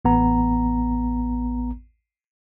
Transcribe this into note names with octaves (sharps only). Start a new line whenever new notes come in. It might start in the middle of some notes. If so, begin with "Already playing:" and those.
A1 B3 A#5